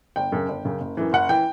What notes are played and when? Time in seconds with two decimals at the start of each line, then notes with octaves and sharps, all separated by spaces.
0.16 G1 G5
0.32 F#2 C#3
0.48 G1
0.65 F#2 C#3
0.81 F#1
0.97 F#2 E3
1.13 F#1 F#5
1.29 E3 G5